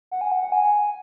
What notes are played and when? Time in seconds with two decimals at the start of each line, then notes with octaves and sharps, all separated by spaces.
0.11 F#5
0.21 G#5
0.32 F#5
0.42 F#5
0.52 G#5